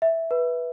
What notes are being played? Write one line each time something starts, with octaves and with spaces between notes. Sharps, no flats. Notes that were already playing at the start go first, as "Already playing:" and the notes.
E5
B4